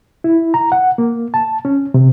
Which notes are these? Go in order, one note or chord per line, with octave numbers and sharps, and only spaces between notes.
E4
A#5
F#5
A#3
A5
C#4
C3